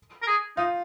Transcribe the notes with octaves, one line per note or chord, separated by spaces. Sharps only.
A#4
G#4
D#4 F4